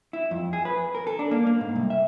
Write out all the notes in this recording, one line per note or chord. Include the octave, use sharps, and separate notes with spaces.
E4
F2
G#4
B4
A#4
A4
D4
A#3
A#3
G#2
C2
E5